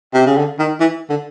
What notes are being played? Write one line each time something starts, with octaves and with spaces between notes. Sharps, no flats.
C3
C#3
D3
D#3
E3
D3